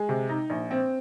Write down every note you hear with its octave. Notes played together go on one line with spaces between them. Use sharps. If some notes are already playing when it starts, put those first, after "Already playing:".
Already playing: G#3
C3
D#4
A#1
C4